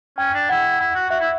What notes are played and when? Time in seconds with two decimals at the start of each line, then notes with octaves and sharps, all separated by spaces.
0.18 C#4 G5
0.34 D4
0.49 E4 F#5
0.80 E4
0.95 F#4
1.10 F#4 E5
1.20 E4